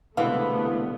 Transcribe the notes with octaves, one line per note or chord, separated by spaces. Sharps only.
C2 B2 D3 E3 G#3 A3 B3 F5